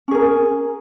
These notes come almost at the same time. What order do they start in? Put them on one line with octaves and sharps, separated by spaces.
C#4 G#4 A#4